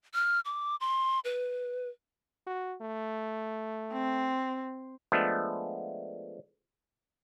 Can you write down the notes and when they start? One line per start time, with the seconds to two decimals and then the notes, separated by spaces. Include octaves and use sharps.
0.14 F6
0.45 D6
0.80 C6
1.24 B4
2.47 F#4
2.81 A3
3.93 C4
5.12 F3 G#3 A3 B3 D4